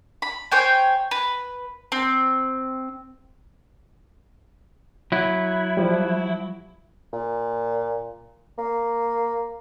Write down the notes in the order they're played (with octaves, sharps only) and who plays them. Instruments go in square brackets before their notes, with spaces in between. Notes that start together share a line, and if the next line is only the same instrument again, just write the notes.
[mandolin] B5
C5 C#5 G5 G#5
B4
C4
[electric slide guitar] F#3 E4
[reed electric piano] F3 G3
[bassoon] A#2
A#3